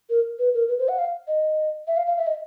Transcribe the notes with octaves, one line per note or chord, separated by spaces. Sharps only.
A#4
B4
A#4
B4
C5
F#5
F5
D#5
E5
F5
F5
E5
D#5